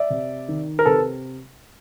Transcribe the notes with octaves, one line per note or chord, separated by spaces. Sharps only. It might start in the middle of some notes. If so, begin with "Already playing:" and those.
Already playing: D5 E5
C3
D#3
A#4
C3 A4 B4